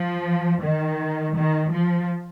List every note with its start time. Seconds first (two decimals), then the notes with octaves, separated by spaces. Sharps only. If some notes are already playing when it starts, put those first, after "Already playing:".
Already playing: F3
0.63 D#3
1.35 D#3
1.72 F3